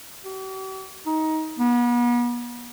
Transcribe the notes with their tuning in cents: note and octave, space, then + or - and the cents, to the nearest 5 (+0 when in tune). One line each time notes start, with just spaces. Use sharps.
G4 -45
D#4 +20
B3 -40